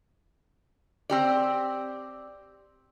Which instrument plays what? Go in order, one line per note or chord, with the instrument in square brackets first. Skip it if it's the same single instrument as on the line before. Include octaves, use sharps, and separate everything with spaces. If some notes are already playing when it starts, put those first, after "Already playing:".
[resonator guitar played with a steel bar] C4 G4 D5